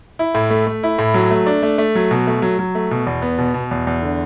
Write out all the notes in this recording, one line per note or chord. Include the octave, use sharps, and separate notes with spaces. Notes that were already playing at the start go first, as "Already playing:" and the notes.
E4
A2
A3
A3
E4
A2
F#3
A3
D4
A3
A3
F#3
B2
A3
F#3
F#3
A3
B2
E2
B3
B2
B2
E2
E2
D3